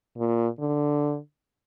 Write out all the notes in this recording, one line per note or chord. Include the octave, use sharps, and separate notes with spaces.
A#2
D3